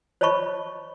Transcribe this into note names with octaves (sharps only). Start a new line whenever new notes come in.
C5 C#5 D#5 A5 B5 C#6